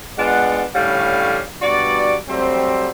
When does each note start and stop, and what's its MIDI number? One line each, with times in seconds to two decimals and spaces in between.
0.18 0.64 56
0.18 0.64 59
0.18 0.64 62
0.18 0.64 65
0.18 0.64 78
0.75 1.41 45
0.75 1.41 50
0.75 1.41 55
0.75 1.41 61
0.75 1.41 73
0.75 1.41 77
1.62 2.15 43
1.62 2.15 47
1.62 2.15 66
1.62 2.15 74
2.28 2.90 54
2.28 2.90 55
2.28 2.90 57
2.28 2.90 60